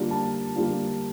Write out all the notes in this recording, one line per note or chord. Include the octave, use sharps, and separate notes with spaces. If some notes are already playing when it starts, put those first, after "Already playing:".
Already playing: D3 G3 A#3 D4 F4
A5
D3 G3 A#3 D4 F4